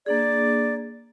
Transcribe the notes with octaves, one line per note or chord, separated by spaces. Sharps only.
A#3 D4 G#4 D5